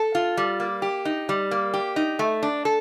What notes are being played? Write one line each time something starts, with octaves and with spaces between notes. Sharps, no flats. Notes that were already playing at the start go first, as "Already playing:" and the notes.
Already playing: A4
F4
G3
A#3
G4
D#4
G3
A#3
G4
D#4
A3
D4
A4